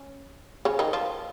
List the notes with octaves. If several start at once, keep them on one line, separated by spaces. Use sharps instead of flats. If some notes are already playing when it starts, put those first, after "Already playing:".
Already playing: C#4
C#3 C#4
D#3 D#4
F3 F4